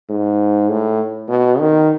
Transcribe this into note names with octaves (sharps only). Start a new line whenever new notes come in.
G#2
A2
B2
D#3